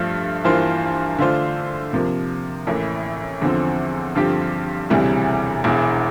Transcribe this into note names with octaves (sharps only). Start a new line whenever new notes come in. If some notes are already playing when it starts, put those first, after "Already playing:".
Already playing: G2 F3 A3
G2 E3 A#3 F4 C5
D3 A3 D4 F4 C5
C3 F3 A#3
A1 A2 E3 A#3 E4
E2 D3 F3 C4
G2 D3 F3 C4 G4
E1 D2 C3 E3 G3
E1 E2 E3